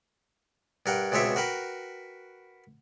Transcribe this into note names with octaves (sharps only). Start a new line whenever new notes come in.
G2 A#4 F#5 G5
C#2 B2 C4 C#5 E5 D6
F#4 A#4 B4 G5